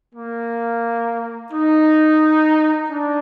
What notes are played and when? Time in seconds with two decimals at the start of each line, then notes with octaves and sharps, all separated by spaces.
0.15 A#3
1.52 D#4
2.91 D4